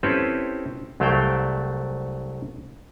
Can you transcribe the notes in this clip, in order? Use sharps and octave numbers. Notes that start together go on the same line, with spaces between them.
C4 C#4 E4 G4 A4 B4
C2 F#3 A3 C5 F5 G5